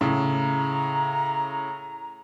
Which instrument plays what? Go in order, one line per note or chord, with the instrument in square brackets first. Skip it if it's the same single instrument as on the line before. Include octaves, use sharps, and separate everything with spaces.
[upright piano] A2 C#3 [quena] A#5